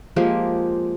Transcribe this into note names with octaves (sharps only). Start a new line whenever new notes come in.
F3 G#3 A#3 G4